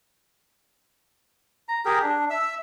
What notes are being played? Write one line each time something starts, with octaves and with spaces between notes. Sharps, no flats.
A#5
G4 G#4 A#4
D4
E5 E6